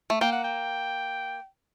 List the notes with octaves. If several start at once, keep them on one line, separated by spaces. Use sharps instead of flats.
A3
A#3 G5
F#5
G5